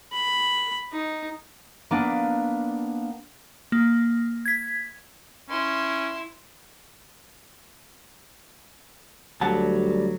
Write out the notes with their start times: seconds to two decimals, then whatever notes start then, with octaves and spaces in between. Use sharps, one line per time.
0.13 B5
0.92 D#4
1.91 A#3 B3 D4
3.72 A#3
4.45 G#6 B6
5.50 C#4 E4 C6
9.41 D2 F#3 G3 F#5 A5